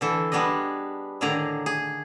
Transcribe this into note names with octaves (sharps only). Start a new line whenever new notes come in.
D3 E3 A4
G3 B3 D4 G#4 D#5
A2 D3 D#3 G#4 D5 A#5
G#4